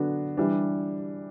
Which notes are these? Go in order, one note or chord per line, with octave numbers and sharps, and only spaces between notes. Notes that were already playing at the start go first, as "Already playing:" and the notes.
Already playing: D3 F#3 B3 D4 F#4
E3 G3 D4